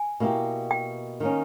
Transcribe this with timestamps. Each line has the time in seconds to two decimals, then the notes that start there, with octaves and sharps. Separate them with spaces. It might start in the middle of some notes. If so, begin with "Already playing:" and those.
Already playing: G#5
0.20 B2 A#3 E4 G4
0.71 G5
1.20 D#3 A#3 C#4